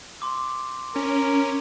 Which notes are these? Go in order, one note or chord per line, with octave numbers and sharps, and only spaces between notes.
C6 D6 E6
C#4 A#4